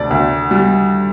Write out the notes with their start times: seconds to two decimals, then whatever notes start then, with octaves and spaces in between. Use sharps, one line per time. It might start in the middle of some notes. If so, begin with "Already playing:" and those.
Already playing: D2 C3 A4 D5
0.11 D2
0.51 G3